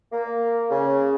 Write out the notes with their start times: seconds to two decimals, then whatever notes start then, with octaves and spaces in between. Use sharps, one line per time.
0.12 A#3
0.70 C#3